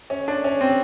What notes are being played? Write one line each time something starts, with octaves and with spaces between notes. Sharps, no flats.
C#4
D4
C#4
C4